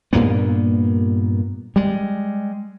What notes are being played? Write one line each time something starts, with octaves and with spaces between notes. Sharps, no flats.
G2 A#2 A#3 B3
G3 G#3